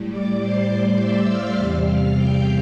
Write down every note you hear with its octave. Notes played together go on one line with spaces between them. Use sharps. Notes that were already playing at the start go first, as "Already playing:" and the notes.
Already playing: A2 G3
D5 D6
C5 C6
D5 D6
E5 E6
F5 F6
E2 C3 G3 F5 F6
F5 F6
G5 G6